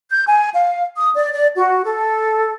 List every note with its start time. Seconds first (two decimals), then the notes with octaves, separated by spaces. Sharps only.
0.11 G6
0.26 G#5
0.54 F5
0.96 D#6
1.15 D5
1.32 D5
1.55 F#4
1.84 A4